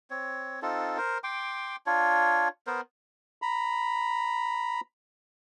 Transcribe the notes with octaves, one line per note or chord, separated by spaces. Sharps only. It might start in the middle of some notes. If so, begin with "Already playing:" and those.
C4 C#5
C4 D#4 F4 A4
A#4 C5
G5 C6 D6
D4 F4 C#5
B3 A#4 C5
A#5 B5